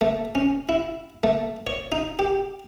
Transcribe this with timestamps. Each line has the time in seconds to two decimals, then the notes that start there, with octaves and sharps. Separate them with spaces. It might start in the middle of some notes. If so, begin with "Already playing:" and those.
0.01 A3
0.35 C#4
0.69 E4
1.23 A3
1.67 C#5
1.92 D#4
2.19 G4